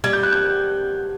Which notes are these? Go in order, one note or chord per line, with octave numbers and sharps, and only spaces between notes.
G3 G#6
G6
F#6
G6